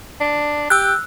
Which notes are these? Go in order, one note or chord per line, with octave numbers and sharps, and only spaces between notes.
D4
G4 E6 F#6